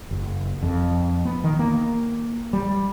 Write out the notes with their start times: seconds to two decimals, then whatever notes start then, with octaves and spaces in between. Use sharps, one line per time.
0.11 F#1
0.63 F2
1.25 B3
1.44 D#3
1.59 A#3
2.53 G3